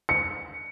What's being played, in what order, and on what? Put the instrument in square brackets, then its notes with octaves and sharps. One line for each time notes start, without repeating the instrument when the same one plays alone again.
[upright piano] C#7